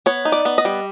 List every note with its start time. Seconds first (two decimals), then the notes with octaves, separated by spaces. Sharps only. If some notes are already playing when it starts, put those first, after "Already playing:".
0.06 B3 C#5
0.25 D#4
0.32 D5
0.45 B3
0.58 D#5
0.65 G3